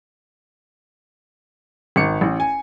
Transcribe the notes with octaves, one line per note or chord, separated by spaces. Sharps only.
G#1 C#7
A1
G#5